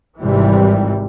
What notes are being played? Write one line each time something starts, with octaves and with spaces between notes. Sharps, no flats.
G#1 G#2 C3 E3 G3